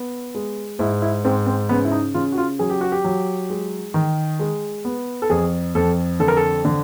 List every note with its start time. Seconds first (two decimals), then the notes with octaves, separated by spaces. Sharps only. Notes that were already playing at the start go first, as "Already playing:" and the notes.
Already playing: B3
0.35 G#3
0.79 G#2 E4
1.02 E4
1.24 G#2 C4
1.46 C4
1.69 C#3 B3
1.85 E4
1.92 D#4
2.14 C#3 F4
2.32 F#4
2.38 F4
2.59 F#3 G#4
2.70 G4
2.81 F#4
2.92 G4
3.04 F#3
3.50 G#3
3.94 D#3
4.40 G#3
4.85 B3
5.22 A4
5.30 F2 G#4
5.75 F2 A4
6.20 D3 A4
6.28 A#4
6.37 A4
6.65 D3